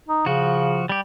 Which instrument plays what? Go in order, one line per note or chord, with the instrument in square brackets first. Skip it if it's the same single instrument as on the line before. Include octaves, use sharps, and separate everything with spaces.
[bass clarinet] D#4
[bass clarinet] C#3 [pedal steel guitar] F3 F#4
[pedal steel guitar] G3 G4